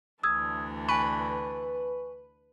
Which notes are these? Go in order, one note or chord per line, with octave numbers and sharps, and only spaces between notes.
D2 E3 D4 D#6 E6 G#6
B4 G#5 C#6